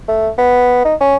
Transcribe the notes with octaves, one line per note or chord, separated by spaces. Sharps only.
A3
B3
D#4
C#4